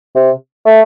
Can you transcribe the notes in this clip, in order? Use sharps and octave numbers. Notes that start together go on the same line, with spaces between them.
C3
A3